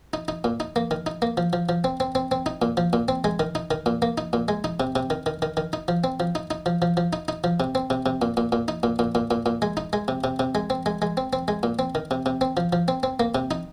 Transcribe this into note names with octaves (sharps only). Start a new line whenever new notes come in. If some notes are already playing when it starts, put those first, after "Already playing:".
D#4
D#4
A#2
D#4
A#3
D#3
D#4
A#3
F3
F3
F3
C4
C4
C4
C4
D#4
A#2
F3
A#2
C4
G#3
D#3
D#4
D#3
A#2
A#3
D#4
A#2
G#3
D#4
C3
C3
D#3
D#3
D#3
D#3
D#4
F3
C4
F3
D#4
D#4
F3
F3
F3
D#4
D#4
F3
C3
C4
C3
C3
A#2
A#2
A#2
D#4
A#2
A#2
A#2
A#2
A#2
G#3
D#4
G#3
C3
C3
C3
G#3
C4
G#3
G#3
C4
C4
G#3
A#2
C4
D#3
C3
C3
C4
F3
F3
C4
C4
A#3
C3
D#4